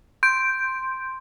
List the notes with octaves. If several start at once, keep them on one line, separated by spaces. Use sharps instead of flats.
C6 G6 D7